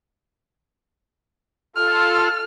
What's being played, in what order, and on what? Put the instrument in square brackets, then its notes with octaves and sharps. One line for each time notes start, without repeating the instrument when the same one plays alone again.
[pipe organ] F4 A4 [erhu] F6